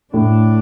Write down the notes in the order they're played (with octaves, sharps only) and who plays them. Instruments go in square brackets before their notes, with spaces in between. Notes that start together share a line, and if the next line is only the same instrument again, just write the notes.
[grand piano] A2 [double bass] D4